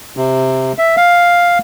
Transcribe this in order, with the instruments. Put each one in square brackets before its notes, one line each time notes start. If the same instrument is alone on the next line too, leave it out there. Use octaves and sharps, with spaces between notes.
[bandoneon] C3
E5
F5